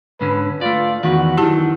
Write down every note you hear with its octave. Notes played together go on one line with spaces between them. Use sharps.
G#2 D3 C#4 B4
A3 F4 D5
E2 D#3 F#4 B4
F#2 D#3 E4 G4 A5